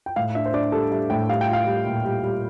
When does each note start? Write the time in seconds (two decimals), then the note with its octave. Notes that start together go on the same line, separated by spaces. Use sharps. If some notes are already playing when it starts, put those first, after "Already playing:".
0.06 G5
0.16 A2 F5
0.35 D4 E5
0.46 C5
0.54 D4 D5
0.72 G3 A4
0.92 G3 E5
1.10 A2 G5
1.29 G3 F5
1.41 G5
1.49 F4 F5
1.67 G3
1.86 A#2
2.05 G3
2.24 G3